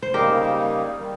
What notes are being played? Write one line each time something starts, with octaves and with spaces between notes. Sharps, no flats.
C5
C#3 G3 A#3 D#4 G4 A#4
D#3 G3